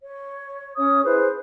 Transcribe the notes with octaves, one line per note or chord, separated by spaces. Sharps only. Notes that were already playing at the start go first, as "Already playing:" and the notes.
C#5
C#4 C#5 D#6
E4 G#4 B4 C5